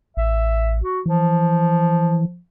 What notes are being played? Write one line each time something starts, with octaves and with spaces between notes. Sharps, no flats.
A1 E5
F#4
E3 F3